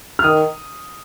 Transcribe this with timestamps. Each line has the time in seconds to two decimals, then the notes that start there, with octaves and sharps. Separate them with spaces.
0.19 F6
0.24 D#3 D#6